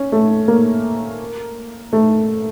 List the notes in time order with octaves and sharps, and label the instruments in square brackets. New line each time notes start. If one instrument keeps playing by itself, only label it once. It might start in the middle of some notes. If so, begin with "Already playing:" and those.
Already playing: [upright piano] C#4
A3
A#3
A3